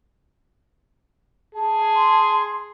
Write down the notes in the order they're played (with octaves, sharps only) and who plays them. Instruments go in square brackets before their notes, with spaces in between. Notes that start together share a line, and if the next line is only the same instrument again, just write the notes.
[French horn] G#4 [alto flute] A5
[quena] C6